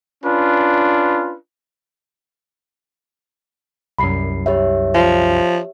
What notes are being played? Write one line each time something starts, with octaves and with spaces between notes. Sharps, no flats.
C#4 D4 F4 B4
C2 F#2 B5 C7
G4 C#5 E5
F3